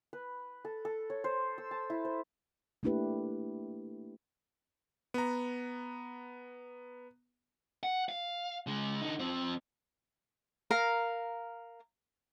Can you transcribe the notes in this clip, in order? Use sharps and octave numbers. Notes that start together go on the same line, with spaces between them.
B4
A4
A4
C#5
C5
E6
A5
E4
C5
A3 A#3 D4 E4 G4 B4
B3 A#5
F#5
F5
C#3 G#3
D3 D#4
F2 C4
A#4 F5 A#5